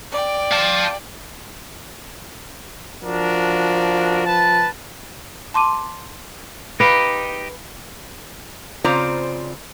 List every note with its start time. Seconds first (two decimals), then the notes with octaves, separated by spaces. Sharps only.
0.11 D5 G5
0.51 F5 A5
3.03 F3 D4 F#4 A#4
4.26 B4 A5
5.54 A5 C6 D6 D#7
6.80 D#4 G4 B4 F5
8.84 C#3 C4 F4 C5 D5 A#5